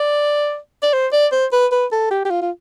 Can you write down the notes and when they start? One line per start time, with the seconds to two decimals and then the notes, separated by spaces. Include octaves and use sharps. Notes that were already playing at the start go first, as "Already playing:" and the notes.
Already playing: D5
0.83 D5
0.93 C5
1.13 D5
1.32 C5
1.53 B4
1.72 B4
1.92 A4
2.11 G4
2.25 G4
2.30 F4
2.42 F4